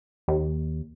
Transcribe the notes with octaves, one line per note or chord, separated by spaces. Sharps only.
D#2